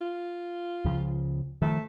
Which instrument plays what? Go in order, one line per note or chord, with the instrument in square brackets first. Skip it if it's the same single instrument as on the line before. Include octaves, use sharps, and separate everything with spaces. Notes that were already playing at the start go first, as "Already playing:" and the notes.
[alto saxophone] F4
[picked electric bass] C#2 C#3 F3
[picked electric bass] D#3 F3 [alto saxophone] A3